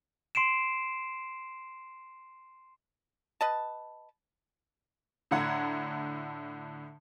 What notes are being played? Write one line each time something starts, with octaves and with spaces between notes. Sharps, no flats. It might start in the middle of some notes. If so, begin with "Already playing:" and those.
C6 C7 D7 E7
B4 D#5 A5
A2 D3 F#5 A#5 G#6